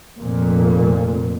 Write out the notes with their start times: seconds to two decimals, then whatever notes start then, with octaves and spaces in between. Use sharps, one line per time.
0.19 F1 F2 A#2